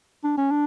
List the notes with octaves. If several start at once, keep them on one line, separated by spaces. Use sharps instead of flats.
D4
C#4
D4